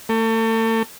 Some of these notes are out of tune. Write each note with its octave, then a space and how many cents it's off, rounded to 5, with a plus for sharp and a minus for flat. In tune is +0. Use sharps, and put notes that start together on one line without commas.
A3 +35